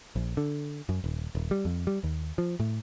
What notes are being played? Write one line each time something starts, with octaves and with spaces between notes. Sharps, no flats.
A#1
D3
F#2
D#1
D#1
G3
F2
G3
D#2
F3
A2